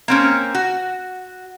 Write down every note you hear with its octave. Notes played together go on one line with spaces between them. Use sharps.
A#3 C4 C#4
F#4